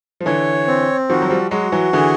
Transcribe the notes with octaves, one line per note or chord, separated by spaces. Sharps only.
F3
D3 E3 C#5
C4
D#3 F3 F#4
F#3
F3 G3
F#3 G#3 F#4
E3 F#3
D3 E3 G#4